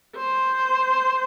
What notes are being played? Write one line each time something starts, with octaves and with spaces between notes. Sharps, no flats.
C5